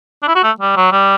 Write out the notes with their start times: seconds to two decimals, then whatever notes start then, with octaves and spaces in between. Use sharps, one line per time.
0.23 D4
0.28 E4
0.35 F#4
0.44 A3
0.60 G3
0.76 F#3
0.92 G3